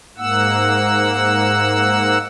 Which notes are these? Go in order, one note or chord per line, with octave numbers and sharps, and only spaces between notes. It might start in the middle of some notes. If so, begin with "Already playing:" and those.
G#2 A#3 F#5 E6